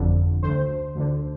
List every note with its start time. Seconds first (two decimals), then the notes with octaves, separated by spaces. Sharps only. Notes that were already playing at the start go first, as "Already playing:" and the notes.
Already playing: G1 F2 D3
0.43 D2 D3 C5
0.95 D2 D3